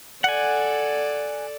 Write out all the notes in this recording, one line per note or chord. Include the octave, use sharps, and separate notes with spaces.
A4 D5 F#5 G#5